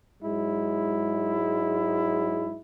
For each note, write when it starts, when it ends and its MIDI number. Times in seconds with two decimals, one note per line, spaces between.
0.23 2.60 44
0.23 2.60 54
0.23 2.60 56
0.23 2.60 64